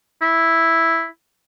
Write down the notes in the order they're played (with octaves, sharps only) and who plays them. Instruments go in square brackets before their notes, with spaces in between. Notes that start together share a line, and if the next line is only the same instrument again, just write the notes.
[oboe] E4